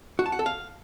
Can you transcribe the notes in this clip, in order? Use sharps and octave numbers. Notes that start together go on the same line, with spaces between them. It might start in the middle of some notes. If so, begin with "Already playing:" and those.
F#4
A5
F#5
A4
F5